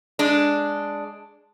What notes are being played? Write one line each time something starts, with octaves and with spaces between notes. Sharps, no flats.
G#3 D4